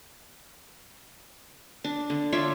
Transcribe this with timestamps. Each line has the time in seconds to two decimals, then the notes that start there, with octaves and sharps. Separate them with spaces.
1.84 D4
2.10 D3
2.32 F4 C#5 D5 E5